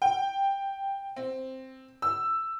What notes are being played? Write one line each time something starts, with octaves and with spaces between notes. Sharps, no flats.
G5
C4
E6